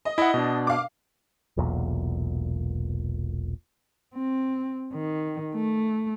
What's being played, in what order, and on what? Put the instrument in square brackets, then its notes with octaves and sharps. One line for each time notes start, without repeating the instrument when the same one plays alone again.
[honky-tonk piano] D#5
[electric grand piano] E4 F#5 [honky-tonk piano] D#5
[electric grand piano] B2 D4
[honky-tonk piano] F5 D6
[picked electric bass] E1 B1 E2 A#2
[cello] C4
D#3
A3